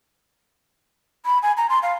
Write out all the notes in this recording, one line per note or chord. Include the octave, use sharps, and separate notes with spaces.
B5
G#5
A#5
C6
F5